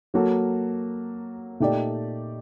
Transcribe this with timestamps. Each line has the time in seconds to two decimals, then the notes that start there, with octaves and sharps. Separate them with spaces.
0.14 F#3 A#3 F#4 A4
1.60 A#2 A3 D#4 G4 D5